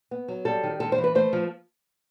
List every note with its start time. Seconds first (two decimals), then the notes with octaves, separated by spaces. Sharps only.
0.11 B3
0.28 F#3
0.45 G3 A4
0.63 D#3
0.80 G#3 A4
0.92 C5
0.98 E3
1.04 B4
1.15 A3 C5
1.33 F3